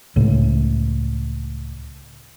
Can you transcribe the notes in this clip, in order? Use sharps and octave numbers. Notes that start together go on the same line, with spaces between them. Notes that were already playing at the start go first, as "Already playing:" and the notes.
C#2 A2